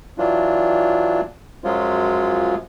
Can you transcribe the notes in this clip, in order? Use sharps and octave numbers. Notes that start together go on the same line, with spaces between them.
E3 F#3 D4 F4
F#2 F3 F#3 G#3 F4